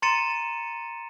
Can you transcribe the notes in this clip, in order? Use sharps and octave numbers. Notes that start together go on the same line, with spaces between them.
A#5 C6 A6 C#7 D#7 E7